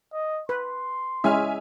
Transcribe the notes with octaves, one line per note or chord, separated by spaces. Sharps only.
D#5
B4 C6
G#3 C#4 E4 E5 G#5 F6